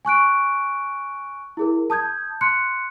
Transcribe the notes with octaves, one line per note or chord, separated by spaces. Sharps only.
G#5 C#6 F#6 D7
E4 G#4 A#4
A5 D#6 G6 G#6
C6 F#6 C#7